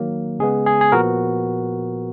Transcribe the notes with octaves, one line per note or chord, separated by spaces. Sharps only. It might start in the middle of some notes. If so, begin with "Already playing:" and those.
Already playing: D#3 F#3 A#3
C#3 G#3 B3 G#4
G#4
G#4
A#2 F3 B3 F#4 A#4